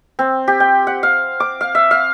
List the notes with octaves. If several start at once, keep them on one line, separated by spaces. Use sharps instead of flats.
C4
G4
G5
F#5
F5
D6
F5
E5
F5